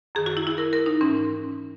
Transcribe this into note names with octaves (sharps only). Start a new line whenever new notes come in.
F#2 D#3 G#4
F#4
E4
E4
A#4
A#4
D#4
G#2 E3 C#4